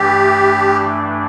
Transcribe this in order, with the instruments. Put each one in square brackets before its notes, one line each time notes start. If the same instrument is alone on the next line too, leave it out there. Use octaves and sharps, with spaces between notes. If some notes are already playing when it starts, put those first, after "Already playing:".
Already playing: [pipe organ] G2 E3 A3 D4 [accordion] G4